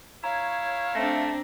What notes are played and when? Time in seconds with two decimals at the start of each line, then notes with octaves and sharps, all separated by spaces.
0.24 E4 C#5 F5 A#5
0.95 A3 C4 D4 A#6